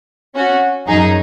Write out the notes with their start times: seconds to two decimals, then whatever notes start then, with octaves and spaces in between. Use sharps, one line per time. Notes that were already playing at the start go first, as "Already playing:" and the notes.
0.35 C#4 F#4
0.87 F#2 F#3 D#4 G#4